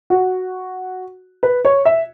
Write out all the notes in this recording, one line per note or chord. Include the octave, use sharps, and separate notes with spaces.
F#4
B4
C#5
E5